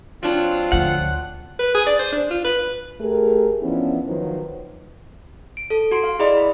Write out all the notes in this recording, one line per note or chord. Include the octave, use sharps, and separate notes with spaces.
F#3 C4 D4 F4
D2 F3 F#5
B4
G#4
D5
C5
D4
F4
B4
A3 G4 G#4 A#4
E3 F3 B3 C#4 D4 E4
D#3 F3 F#3 B4 C5
D7
A4
F#4 C6 D7
F5
E4 G#4 D5 D#5 B5
B5